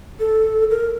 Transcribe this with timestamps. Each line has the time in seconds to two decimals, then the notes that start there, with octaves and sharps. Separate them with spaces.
0.20 A4
0.71 A#4